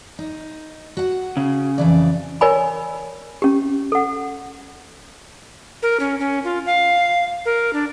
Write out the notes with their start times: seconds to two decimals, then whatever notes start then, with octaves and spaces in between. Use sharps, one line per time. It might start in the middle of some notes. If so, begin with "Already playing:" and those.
0.19 D#4
0.97 F#4 F#5
1.37 C#3
1.78 F2 E3 D5
2.41 A#4 C#5 D5 G#5 B5
3.42 C#4 G4
3.92 A4 F#5
5.82 A#4
6.00 C#4
6.19 C#4
6.44 F4
6.66 F5
7.45 A#4
7.73 D4